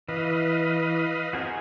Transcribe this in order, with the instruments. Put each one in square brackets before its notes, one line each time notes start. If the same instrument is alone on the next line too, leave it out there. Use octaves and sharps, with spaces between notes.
[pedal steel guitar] E3 [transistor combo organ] B4 D#5 F5
[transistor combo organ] C4 [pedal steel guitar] F#4 G#4 A#4